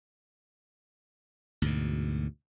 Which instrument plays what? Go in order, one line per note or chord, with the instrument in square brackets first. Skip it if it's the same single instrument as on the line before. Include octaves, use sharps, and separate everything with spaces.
[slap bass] D2 G#2 B2